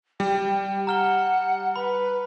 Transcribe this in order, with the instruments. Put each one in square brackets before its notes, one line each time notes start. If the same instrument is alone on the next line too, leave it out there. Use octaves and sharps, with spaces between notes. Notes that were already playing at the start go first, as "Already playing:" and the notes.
[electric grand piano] G3 [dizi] G5
[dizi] F#5 [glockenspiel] A#5 F6 G7
[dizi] B4 [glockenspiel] B5